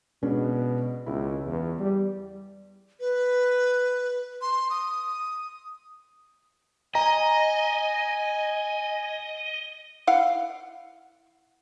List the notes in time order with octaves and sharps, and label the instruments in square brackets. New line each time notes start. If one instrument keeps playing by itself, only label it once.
[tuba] B2 [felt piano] G#3 C#4 D4
[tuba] C#2 [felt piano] E4
[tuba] E2
G3
[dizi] B4
C6
D#6
[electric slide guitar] D#5 [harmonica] G#5 [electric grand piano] A#5
[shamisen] E4 F5 F#5